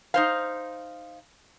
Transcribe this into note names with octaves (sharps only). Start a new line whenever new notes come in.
D#4 C5 F5